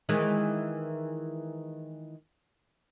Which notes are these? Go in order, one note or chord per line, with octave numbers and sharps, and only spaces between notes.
D#3 E3 G#3